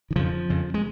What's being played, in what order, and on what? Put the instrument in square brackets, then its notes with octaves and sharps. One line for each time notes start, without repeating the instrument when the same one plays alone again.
[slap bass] D#3
F2 C#3 F3
F2 C#3
G#3